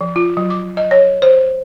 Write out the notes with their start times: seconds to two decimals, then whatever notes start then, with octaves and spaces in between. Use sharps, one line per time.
0.01 F3
0.16 F4
0.37 F#3
0.50 D6
0.77 D#5
0.91 C#5
1.22 C5